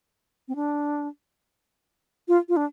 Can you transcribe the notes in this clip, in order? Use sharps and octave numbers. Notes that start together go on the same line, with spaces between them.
C4
D4
F4
F4
D4